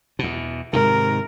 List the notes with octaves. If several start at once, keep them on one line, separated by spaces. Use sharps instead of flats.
E2 B2
G#2 C3 D#3 A#4